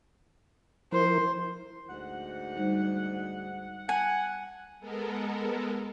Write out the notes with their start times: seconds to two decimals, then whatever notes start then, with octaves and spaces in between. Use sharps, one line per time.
0.92 F3 E4 A#4 C5
1.89 D2 G#2 F#5
2.57 G3 D#4 C5
3.89 F#5 G#5
4.80 G#3 B3 A4 A#4